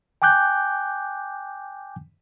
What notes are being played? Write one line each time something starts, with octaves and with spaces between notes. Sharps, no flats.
G5 G#5 D6 F#6 G6